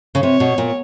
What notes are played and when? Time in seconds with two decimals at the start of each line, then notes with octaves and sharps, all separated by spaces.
0.15 C#3
0.22 C3 C#5
0.40 B2
0.58 A#2